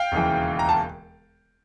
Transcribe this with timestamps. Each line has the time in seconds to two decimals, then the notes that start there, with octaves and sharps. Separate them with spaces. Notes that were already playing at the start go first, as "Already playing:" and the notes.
Already playing: F5 G5
0.12 E1 D#2 C#3 E3
0.59 A#5
0.69 A5